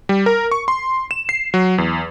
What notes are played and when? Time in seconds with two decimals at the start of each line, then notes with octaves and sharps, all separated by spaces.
0.09 G3
0.26 A#4
0.51 C#6
0.68 C6
1.11 E7
1.29 C7
1.54 F#3
1.78 E2